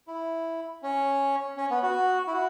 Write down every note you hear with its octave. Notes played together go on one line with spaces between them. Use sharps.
E4
C#4
C#4
B3
F#4
E4
F#4